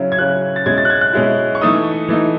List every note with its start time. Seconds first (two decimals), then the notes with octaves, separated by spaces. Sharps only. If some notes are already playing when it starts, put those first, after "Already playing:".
Already playing: C#3 F#3 C#4 E4
0.12 G#6
0.19 C#3 F#3 C#4 E4 F#6
0.56 A6
0.66 B2 G#3 C#4 E4 G#6
0.78 A6
0.85 F#6
0.90 G#6
1.01 F#6
1.13 B2 G#3 C#4 E4
1.55 C#6
1.61 E3 A3 D#4 D#6
2.09 E3 A3 D#4